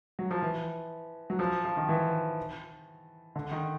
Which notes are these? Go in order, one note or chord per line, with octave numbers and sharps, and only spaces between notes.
F#3
F3
E3
F#3
F3
F3
D#3
E3
D3
D#3